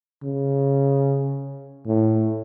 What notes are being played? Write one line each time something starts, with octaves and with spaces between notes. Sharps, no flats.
C#3
A2